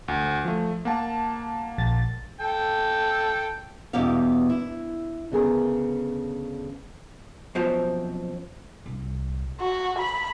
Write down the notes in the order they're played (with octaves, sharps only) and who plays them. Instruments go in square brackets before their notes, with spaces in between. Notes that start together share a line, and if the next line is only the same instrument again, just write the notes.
[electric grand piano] D2
F3 A3
A#3 F#5 A5
[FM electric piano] A#1 A6
[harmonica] A4 G5
[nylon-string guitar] E2 G2 B2 G4 F5
E4
D2 C#3 B3 G#4 A#4
[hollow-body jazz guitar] F#2 B2 F3 [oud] C4 F#4 C5
[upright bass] C2
[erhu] F#4
B5